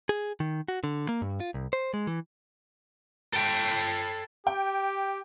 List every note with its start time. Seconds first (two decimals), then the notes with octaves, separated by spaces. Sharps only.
0.09 G#4
0.40 D#3
0.68 F#4
0.84 D3
1.09 A#3
1.22 G2
1.40 F4
1.54 C2
1.73 C5
1.94 G#3
2.07 E3
3.33 A4 G5
4.47 G4 G5